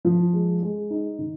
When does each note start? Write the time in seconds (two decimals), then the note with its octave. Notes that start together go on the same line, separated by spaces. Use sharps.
0.05 F3
0.33 G#3
0.62 G#3
0.90 D#4
1.19 D#3